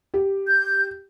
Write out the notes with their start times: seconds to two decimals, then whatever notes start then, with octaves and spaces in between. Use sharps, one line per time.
0.14 G4
0.46 G6